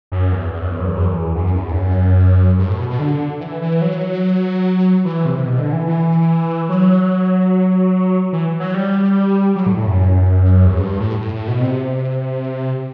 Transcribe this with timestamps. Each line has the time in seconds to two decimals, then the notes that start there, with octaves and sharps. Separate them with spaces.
0.12 F#2
0.32 E2
0.52 E2
0.61 F#2
0.71 E2
0.79 F#2
0.88 E2
0.96 F#2
1.05 E2
1.35 F#2
1.55 E2
1.71 G2
1.76 F#2
2.59 G2
2.69 A2
2.79 B2
2.90 B2
2.99 D3
3.40 E3
3.61 E3
3.82 F#3
5.05 E3
5.26 C3
5.37 C3
5.46 B2
5.59 D3
5.73 E3
5.87 E3
6.69 F#3
8.33 E3
8.60 F#3
8.74 G3
9.55 F#3
9.66 A2
9.77 A2
9.87 F#2
10.66 E2
10.73 F#2
10.80 G2
11.00 A2
11.20 A2
11.33 A2
11.48 B2
11.61 C3